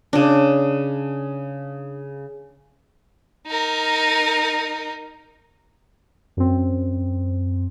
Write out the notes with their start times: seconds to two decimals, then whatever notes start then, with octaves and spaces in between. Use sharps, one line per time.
0.13 C#3 D4
3.47 D#4 A#4
6.37 F#2 C4